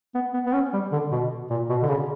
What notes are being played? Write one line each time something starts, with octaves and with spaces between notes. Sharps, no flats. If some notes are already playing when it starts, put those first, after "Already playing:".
B3
B3
B3
C#4
G3
D3
B2
A#2
B2
D3
C#3